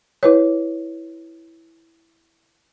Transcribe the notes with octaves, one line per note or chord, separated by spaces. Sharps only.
E4 B4 C#5